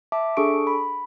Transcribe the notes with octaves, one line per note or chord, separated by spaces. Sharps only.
E5 A5 D6
D4 G#4 A4 C#6 D7
B5